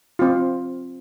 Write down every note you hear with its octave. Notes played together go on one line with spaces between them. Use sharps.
C4 F4